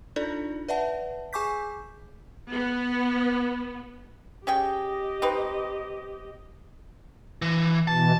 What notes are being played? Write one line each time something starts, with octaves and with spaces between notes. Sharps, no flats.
D4 D#4 F4 A4 D5
B4 D5 E5 F#5 A5
G#4 G#5 C#6 D6 G6 B6
B3
C#4 G4 G#4 D#5 G5
C4 D#4 B4
E3
B2 E3 A5